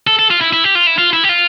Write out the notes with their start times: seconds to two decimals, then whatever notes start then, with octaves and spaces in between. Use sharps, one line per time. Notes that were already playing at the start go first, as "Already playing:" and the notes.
0.07 A4
0.19 A4
0.31 F4
0.41 E4
0.53 E4
0.64 G4
0.75 F4
0.87 E4
0.98 F4
1.13 E4
1.24 G4
1.29 F4